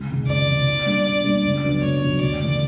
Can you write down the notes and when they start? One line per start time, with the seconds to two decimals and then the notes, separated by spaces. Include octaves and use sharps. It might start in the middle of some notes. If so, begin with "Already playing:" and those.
Already playing: C#2
0.09 C3 D#3 G#3
0.28 C#2 D5
0.47 C3 D#3 G#3
0.66 B2
0.86 G3 A#3 D4
1.05 B2
1.24 G3 A#3 D4
1.44 C#2
1.64 B2 F#3 B3 D4
1.82 C#2 C#5
2.02 B2 F#3 B3 D4
2.21 D2 D5
2.41 C#3 E3 A3